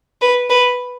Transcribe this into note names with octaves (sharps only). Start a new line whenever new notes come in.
B4
B4